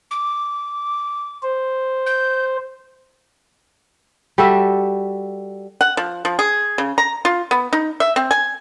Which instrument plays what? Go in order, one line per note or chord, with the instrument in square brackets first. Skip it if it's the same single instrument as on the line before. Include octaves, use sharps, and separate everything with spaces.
[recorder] D6
[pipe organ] C5
[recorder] G6
[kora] G3 F#4 A4 E5
[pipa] F#5
F3
F3
G#4
C#3
A#5
F4
B3
D#4
E5
C4
G#5